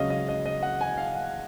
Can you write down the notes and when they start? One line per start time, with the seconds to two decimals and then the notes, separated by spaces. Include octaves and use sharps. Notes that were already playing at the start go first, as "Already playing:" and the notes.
Already playing: C#2 C#3 F#3 C#4 D#5 F5
0.10 D#5
0.28 D#5
0.46 D#5
0.63 F#5
0.81 G#5
0.98 F5
1.15 F#5